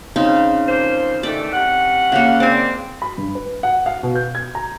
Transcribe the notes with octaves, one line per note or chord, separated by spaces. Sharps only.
C#3 C4 D#4
F3 A#3 C5
D#3 E3 A3 D5 G5
C3 C#4 F#5
C#3 A#3
A#2 G#3 C4 D5 G#5
B5
G2
B4
F#5
F5
B2
G6
G#6
A#5